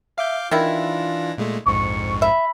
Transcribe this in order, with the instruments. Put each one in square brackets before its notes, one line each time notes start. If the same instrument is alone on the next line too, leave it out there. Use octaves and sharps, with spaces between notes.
[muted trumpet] E5 [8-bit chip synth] F5 D6 G6
[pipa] D#3 E4 [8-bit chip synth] E3 D4 A#6 [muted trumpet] F4
[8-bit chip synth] A#2 G#3 A3
[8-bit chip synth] A#1 F2 G#2 [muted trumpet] C#6
[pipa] E5 [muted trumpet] B5